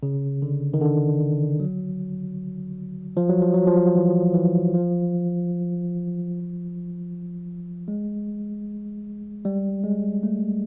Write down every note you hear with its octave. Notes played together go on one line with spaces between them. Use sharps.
C#3
D3
D#3
D3
F#3
F3
F#3
F3
F#3
F3
E3
E3
F3
G#3
G3
G#3
A3